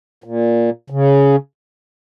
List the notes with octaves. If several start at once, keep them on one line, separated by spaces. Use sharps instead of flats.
A#2
C#3